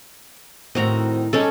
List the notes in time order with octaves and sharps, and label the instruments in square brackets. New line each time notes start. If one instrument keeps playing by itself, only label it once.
[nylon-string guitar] A2 D#3 [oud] C4 F#4 [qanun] D#5 A#5
[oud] G3 D#4 G#4 [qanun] C#4 A4